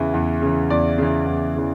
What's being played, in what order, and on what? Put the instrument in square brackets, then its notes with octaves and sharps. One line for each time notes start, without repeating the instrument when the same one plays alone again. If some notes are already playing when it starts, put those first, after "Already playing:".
Already playing: [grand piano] E2 C#3 E3
E2
C#3 E3
E2 D5
C#3 E3
E2
C#3 E3